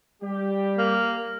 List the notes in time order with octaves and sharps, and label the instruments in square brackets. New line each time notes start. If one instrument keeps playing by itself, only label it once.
[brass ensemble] G3 G4
[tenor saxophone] A#3